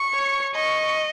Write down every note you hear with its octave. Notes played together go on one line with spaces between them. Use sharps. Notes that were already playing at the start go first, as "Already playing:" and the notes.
Already playing: C#6
C#5
D#5 C#6